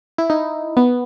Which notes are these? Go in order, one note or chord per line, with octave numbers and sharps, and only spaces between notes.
E4
D#4
B3